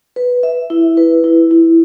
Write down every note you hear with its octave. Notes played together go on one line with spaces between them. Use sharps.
B4
E5
E4
B4
E4
E4